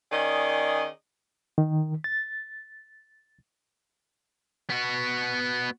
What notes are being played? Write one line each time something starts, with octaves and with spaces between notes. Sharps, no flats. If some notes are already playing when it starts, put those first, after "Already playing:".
D#3 C#4 G#4 D5 D#5
D#3
A6
B3 F#4